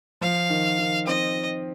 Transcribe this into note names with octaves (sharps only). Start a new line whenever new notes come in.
F3 F5
D#3
D#3
C4 D#5